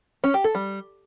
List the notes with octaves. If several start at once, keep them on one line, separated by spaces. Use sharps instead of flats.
C#4
G4
A4
G3